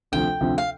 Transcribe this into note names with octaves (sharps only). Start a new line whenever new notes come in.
D2 C3 F3 G5
D2 C3 F3
F5